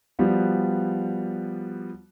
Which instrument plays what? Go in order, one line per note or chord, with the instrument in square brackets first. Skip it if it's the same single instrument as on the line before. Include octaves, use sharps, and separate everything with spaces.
[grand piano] F3 G3 B3 F#4